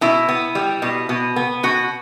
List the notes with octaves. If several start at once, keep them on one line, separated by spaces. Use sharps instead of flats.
B2 E4
B3
G3
B2
B2
B3
B2 F#4